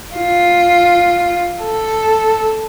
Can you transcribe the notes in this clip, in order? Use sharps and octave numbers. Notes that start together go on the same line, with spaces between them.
F4
A4